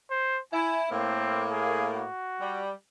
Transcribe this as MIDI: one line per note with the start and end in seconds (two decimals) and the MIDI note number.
0.10 0.40 72
0.53 0.87 64
0.53 0.82 80
0.91 2.04 45
0.91 2.04 58
0.91 1.45 60
1.50 1.90 68
1.95 2.62 66
2.40 2.70 55